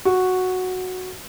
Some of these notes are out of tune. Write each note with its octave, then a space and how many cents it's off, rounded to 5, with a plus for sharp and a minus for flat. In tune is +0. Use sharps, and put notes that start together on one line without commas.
F#4 -5